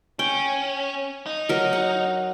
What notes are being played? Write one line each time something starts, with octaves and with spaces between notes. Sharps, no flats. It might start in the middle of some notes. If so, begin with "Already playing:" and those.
C#4 G5
D#4
F#3 A#4
F#5